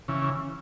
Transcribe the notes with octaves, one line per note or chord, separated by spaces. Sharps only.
C#3 E3